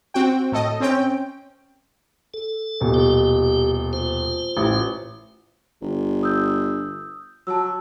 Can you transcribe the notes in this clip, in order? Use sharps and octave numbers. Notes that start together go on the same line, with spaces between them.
C4 F#4 G5
A2 A4 D#5
C4 C#4 G5
A4
D#1 B2
G4
F4 C5
A1
G1
D#6 E6 G6
F#3 A5 E6